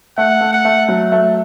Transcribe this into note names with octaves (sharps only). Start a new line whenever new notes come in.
A3 F#5
A3
F#5
A3
F#3
A3